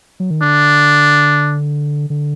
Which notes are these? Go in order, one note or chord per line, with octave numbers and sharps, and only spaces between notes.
F#3
D#3
D3 D4
D3